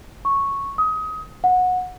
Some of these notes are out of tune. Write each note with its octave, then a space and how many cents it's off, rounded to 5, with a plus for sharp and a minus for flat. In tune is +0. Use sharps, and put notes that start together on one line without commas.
C#6 -5
D#6 +25
F#5 -20